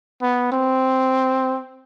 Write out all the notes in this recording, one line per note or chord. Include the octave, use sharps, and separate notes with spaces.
B3
C4